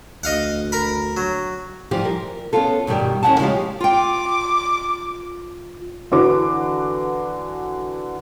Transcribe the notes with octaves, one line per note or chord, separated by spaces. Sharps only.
D2 D#5 F5 F#5
A#4 B5
F#3
E3 F3 G3 G4
A#4
B3 C#4 D4 F4 A4
G2 B2 D#3 G3 G5
D#2 C#4 D#4 E4 F#5 A5
C#3 F3 G#3 D#4 F4 G4
F4 G5 D6
D3 E3 F#4 B4 D6